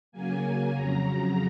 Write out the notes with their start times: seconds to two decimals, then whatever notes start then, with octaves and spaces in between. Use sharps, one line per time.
0.12 C#3 F#3 A#3 G#5
0.71 F2 C#3 F#3 A#5